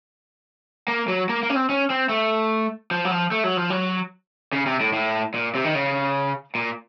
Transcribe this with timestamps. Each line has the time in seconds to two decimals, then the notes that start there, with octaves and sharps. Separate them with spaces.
0.88 A#3
1.08 F#3
1.29 A#3
1.43 A#3
1.50 C#4
1.56 C4
1.69 C#4
1.90 C4
2.09 A3
2.91 F3
3.05 F#3
3.11 F3
3.31 A3
3.44 F#3
3.57 F3
3.70 F#3
4.53 C#3
4.66 C3
4.80 A2
4.93 A2
5.34 A#2
5.55 C3
5.64 D#3
5.75 C#3
6.55 A#2